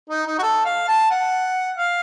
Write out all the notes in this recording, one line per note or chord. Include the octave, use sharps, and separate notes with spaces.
D#4
D#4
F#4
A4
F5
A5
F#5
F5